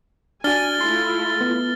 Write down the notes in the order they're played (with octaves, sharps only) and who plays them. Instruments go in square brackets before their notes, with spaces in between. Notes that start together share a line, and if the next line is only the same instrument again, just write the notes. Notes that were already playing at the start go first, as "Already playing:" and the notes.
[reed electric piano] D4 F#4 [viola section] G#5 [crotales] F6 A6 G7
[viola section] A3 E4 F4 [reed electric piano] C6
[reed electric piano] B3